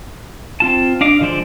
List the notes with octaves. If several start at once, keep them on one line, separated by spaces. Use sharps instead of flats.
C4 F4 A5
D4 D#5 F5 D6
D3 F3 G#3 C5 D5